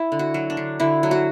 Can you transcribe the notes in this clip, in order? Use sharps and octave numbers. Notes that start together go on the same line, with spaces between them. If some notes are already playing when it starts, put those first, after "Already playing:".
Already playing: E4
D3
F#4
F#3
D4
D3
D3 E4
F#3
F#4